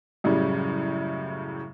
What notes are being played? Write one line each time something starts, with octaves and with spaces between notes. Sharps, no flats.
F#2 A2 C#3 G3